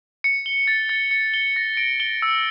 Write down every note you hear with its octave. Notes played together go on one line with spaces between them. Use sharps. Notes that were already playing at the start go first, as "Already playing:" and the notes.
C#7
G7
A6
A6
C#7
G7
A#6
D7
G7
E6